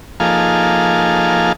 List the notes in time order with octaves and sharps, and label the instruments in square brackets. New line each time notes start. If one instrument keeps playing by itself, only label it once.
[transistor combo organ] F3 A#3 D#4 G#4 A4 F5